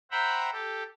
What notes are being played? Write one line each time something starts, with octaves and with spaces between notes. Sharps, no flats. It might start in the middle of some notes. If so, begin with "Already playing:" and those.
C5 E5 F#5 G5 A#5 B5
G4 A4